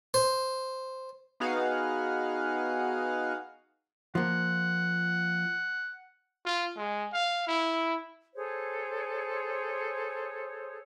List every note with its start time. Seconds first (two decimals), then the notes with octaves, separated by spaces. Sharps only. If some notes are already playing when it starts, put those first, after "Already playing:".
0.14 C5
1.40 B3 D#4 F#4 G#4 F5 F#5
4.15 F3 A#3 F#5
6.45 F4
6.76 G#3
7.12 F5
7.47 E4
8.35 G#4 A4 C5 C#5